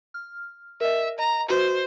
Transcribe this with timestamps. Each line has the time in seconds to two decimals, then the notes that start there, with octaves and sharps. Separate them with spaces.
0.14 F6
0.81 A#4 D#5 E5
1.19 D#5 A#5
1.49 F#4 B4 C5